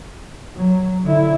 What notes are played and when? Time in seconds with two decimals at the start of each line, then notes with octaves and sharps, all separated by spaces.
0.55 F#3
1.04 D3 E4